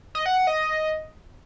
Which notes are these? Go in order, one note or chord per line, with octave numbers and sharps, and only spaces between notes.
D#5
F#5
F#5
D#5